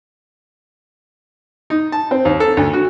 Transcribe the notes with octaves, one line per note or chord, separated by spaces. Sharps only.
D#4
A5
C4
D#2
A4
D2
F#4